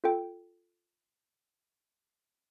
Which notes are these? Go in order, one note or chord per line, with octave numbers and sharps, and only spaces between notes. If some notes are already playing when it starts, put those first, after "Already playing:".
F4 A4 G5